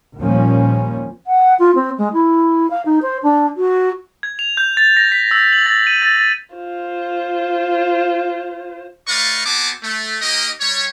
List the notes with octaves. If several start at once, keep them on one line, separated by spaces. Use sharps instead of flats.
D#2 A#2 F3 G3 A#3 C#4
F#5
F4
C4
G#3
E4
F5
D#4
C5
D4
F#4
G#6
F7
G6
A6
A#6
B6
E6
F#7
A6
D#7
A6
A6
F4 C5
A3 B4 D5 D#5 F5 C#6
B3 C4 F#4 G#4 A5 D6
A3
A#3 D#4 G4 A#4 D#5
G3 C#5